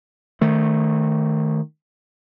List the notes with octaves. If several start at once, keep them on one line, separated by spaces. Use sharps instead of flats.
D#3 A3